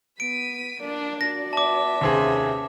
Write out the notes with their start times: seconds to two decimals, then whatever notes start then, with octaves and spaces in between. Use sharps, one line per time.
0.20 B3 B6 D7 D#7
0.81 A#3 D4 D5
1.21 F#4 D5 A#6
1.53 B3 E5 A5 D6
2.01 D#2 C3 C#4 G#4